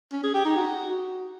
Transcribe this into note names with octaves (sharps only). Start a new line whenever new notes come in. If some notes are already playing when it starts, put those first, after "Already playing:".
C#4
G#4
G4
D#4
F#4